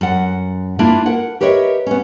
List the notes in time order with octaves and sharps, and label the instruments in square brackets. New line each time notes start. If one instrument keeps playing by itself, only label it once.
[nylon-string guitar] F#2 F#5
A#3 D4 E4 F4 E5
A#4 F#5
G4 A#4 B4 C#5 D#5 E5
B3 C#4